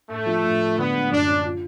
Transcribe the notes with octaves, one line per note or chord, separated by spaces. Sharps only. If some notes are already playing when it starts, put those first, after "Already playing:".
A2 A3
F3
A2
A2
D3 B3
G#3
F#2 D4
C#4
F4